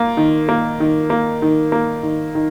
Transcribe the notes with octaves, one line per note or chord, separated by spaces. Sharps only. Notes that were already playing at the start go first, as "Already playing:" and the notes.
Already playing: A#3 F4
D#3
A#3
D#3
A#3
D#3
A#3
D#3
D#3